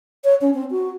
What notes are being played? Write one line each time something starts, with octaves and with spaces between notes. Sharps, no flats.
C#5
C#4
C4
F#4